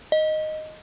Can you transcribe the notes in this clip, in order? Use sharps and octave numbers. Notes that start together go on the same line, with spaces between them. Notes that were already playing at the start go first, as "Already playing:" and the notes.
D#5